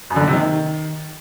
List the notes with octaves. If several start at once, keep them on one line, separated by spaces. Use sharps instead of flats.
F#2
D3
A#2
C3
D#3